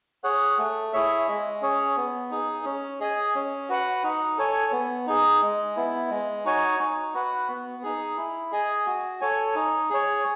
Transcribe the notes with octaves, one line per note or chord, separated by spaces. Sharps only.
G#4 C#5 F#5
A3
E4 G#4 C#5 E5
G#3
C#4 G#4 C#5
B3
D#4 G#4
C#4
G#4 D#5 G#5
C#4
F#4 B4 F#5
D#4
A4 C#5 G#5
B3
D#4 G#4
G#3
B3 E4
G#3
D#4 F#4 C#5 G#5
D#4
F#4 B4 F#5
B3
D#4 G#4
E4
G#4 D#5 G#5
F#4
A4 C#5 G#5
D#4
G#4 C#5